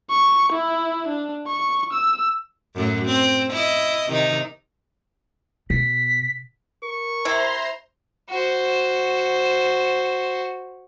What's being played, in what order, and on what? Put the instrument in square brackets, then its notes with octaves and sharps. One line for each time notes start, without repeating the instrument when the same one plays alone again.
[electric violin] C#6
E4
D4
C#6
E6
[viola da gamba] F#2 A2 F#3
C4
E4 D#5
C3 D#3 D#4
[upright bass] B2 [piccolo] B6
[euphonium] A#4 [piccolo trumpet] C#6
[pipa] C3 E4 [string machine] C5 A#5 C6
[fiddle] F#4 C5